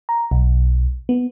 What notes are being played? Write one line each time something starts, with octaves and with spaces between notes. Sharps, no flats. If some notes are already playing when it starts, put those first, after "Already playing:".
A#5
B1
B3